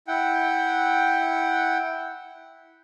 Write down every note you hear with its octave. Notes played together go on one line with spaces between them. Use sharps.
E4 F#5 G5